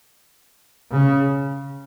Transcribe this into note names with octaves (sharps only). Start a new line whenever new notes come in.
C#3